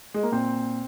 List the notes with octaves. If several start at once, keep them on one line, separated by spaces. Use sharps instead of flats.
G#3
A#3
A#2 C4